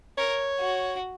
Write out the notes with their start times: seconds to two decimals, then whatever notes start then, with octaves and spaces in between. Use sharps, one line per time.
0.18 A#4 C#5
0.60 F#4